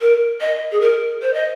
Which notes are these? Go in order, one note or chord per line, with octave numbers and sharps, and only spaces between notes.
A#4
D#5
G#4
A#4
C5
D#5